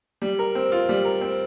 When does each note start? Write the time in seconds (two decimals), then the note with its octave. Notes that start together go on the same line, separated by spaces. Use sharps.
0.22 G3
0.39 A#4
0.55 C4
0.72 F4
0.89 G3
1.05 A#4
1.21 C4